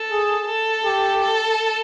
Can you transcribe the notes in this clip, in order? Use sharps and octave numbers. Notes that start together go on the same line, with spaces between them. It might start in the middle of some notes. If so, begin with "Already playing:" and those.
Already playing: A4
G#4
A4
G4
A4